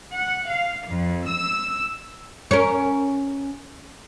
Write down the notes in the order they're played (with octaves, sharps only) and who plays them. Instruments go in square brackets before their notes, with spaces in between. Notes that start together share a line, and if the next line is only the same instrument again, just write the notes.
[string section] F#5
F5
F2
E6
[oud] C#4 A#4